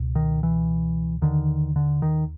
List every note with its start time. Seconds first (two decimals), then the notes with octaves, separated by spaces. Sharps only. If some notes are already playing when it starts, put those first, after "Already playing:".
Already playing: C#2 B2
0.15 D#3
0.43 E3
1.22 D#2 D3 D#3
1.76 D3
2.02 D#3